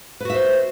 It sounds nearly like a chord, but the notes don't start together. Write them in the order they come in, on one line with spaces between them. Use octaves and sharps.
B4 F#4 E5 C5